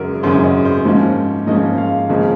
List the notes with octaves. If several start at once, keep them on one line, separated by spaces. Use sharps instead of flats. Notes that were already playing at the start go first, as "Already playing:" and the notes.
Already playing: G#1 F#2 C#3 F#3 C#4 A#4
G#1 F#2 C#3 F#3 C#4 C5
D#5
C5
G#2 F3 A#3 C#4
G#2 F3 A#3 C#4 D#5
F5
C#2 C#3 F3 A#3 C#4